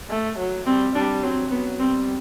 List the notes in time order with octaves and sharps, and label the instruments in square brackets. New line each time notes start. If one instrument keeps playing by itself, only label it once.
[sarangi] A3
F#3
[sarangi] G3 [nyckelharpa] C4
[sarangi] G3 [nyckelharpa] D4
[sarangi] F#3 [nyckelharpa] C4
[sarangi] F#3 [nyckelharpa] B3
[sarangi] G3 [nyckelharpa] C4